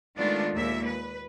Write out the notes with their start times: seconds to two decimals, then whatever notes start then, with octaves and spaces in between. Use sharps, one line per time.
0.17 D#3 G#3 A3 B3 D4 F4
0.54 D#2 A#2 G#3 E5
0.87 B4